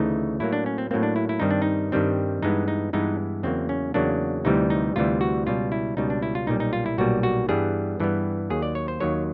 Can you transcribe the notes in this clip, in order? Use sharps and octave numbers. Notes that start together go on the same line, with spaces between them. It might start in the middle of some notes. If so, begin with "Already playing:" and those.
Already playing: D2 C#3 E3 A3 D#4
A2 F#3 A#3 E4
D4
C#4
C4
A2 F#3 A#3 C4
D4
E4
E4
G2 D#3 G3 C4 D#4
D4
D#4
G2 D#3 G3 C4
G2 E3 G#3 B3 D#4
D#4
G2 E3 G#3 B3 D#4
E2 C#3 F#3 A#3 C4
C#4
E2 C#3 F#3 A#3 D4
D2 C3 E3 G3 D#4
D#4
D2 C3 E3 G3 F4
F#4
C#2 B2 G3 F4
E4
C#2 B2 G3 D#4
D4
E4
F4
B1 A#2 G3 D#4
D#4
F4
E4
B1 A#2 G3 F#4
F#4
G2 E3 G3 B3 G#4
G2 E3 G3 B3
D#2 D#3 F#3 G#4
D5
C#5
C5
D#2 D#3 F#3 C#5